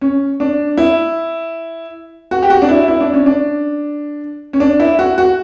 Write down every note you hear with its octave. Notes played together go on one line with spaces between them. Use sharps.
C#4
D4
E4
F#4
G4
F#4
D4
E4
E4
D4
C#4
D4
C#4
D4
E4
F#4
F#4